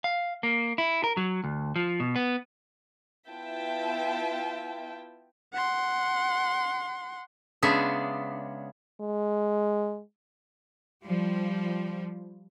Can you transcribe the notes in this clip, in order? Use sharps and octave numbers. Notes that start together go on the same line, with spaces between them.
F5
A#3
E4
A#4
F#3
D2
F3
B2
B3
B3 E4 F4 E5 G5 A5
F#5 C6
C#3 G#3 B3 C#4 D4 E5
G#3
F3 G3